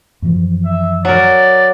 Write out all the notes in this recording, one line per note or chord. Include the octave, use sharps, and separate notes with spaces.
F#2 E3 F3
E5
F#3 A#4 D5